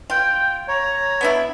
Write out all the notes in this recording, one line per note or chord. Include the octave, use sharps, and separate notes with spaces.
F4 G5
C#5 A#5
B3 D4 E4